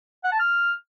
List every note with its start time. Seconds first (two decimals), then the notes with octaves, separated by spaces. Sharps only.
0.24 F#5
0.32 A5
0.40 F6